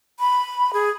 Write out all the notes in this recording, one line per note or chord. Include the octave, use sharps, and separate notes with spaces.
B5
G#4